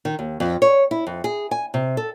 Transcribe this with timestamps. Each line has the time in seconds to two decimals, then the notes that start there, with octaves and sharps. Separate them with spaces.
0.05 D#3
0.19 D#2
0.40 F2
0.62 C#5
0.91 E4
1.07 F2
1.24 G#4
1.51 G#5
1.74 C3
1.97 A4